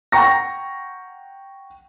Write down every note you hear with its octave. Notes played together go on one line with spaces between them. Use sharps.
F#5 G5 A#5 C#6 A#6